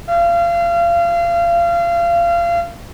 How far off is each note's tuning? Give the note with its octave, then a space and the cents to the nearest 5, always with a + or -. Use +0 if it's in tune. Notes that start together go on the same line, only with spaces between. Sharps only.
F5 -30